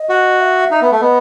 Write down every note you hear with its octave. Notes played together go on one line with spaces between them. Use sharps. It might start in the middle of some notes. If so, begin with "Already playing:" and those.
Already playing: D#5
F#4
E5
D#4
B3
A3
B3 D#5